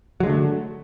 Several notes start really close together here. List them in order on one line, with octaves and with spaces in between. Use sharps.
F#3 G#3 D3 A3